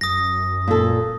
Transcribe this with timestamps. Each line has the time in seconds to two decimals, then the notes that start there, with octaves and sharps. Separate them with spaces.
0.01 F#2 D#6 A#6
0.67 A#2 A4